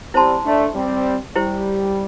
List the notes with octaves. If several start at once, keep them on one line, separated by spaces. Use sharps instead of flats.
G3 C4 E4 C5 A5 C6
A3 D4
G3 C4
G3 E4 G4 C5